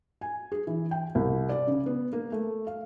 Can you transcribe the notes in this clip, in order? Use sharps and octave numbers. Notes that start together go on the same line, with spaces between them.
G#5
G#4
E3
G5
C2
D5
C#3
B3
A#3
A3
F5